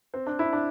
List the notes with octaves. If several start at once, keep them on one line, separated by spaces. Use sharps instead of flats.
C4
D4
E4
D4